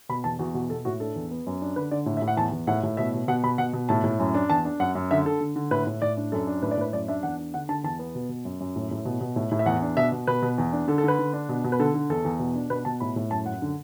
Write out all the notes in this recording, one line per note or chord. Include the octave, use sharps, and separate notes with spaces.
B2 B5
E2 A5
E2 F#4
B2 F#4
B2 A4
A2 F#4
D4 A4
E2
B3
F#2
D4
D3 B4
D3 D5
A2
E5
A2
F#5
E2 A5
E2
A2 F#5
A2
B2 E5
B2
B2 F#5
B2 B5
B2 F#5
B2
A2 A5
A2
F#2
D4
E2 A5
D4
F#2 F#5
F#2
D3 E5
D3 A4
D3
D3
A2 B4
A2
A2 D5
D4
F#2 A4
D4
A2 B4
D5
A2 B4
F#2 D5
D4 E5
E2 F#5
D4
D3 F#5
D3 A5
E2 A5
B3
B2
B2
F#2
F#2
A2
A2
B2
B2
A2
A2
E5
E2 F#5
D4
B2 E5
B2
B2 B4
B2
E2
D4
D3 A4
A4
D3 B4
D3
D4
B2
B2
B4
D3 A4
D3
E2 A4
E2
B2
D4
B2 B4
B2 A5
A2 B5
A2
F#2 A5
F#2 F#5
D3